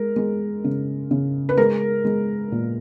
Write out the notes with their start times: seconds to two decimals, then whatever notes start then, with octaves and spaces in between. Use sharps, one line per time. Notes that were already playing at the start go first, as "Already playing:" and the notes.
Already playing: G#3 A#4
0.16 G#3
0.64 C#3
1.11 C#3
1.49 B4
1.58 G#3 A#4
2.05 G#3
2.52 A#2